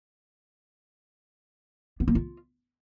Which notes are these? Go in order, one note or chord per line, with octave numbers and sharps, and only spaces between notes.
B3
A#3
F4